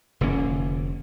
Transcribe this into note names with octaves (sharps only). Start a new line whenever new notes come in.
F1 D3 A#3 C#4